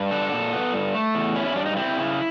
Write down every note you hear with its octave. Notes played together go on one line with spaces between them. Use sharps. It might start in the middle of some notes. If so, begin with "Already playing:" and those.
Already playing: G2
D4 A4
A#2
B3
G2
A3
E2
C#4 E4
E4
G2 D4
D#4
C4 E4
C#3